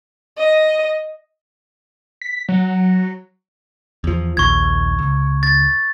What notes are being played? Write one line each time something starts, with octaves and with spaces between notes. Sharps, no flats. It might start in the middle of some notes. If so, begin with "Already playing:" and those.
D#5
B6
F#3
E2 F3
A#1 D#2 C#6 G#6
C#2
A6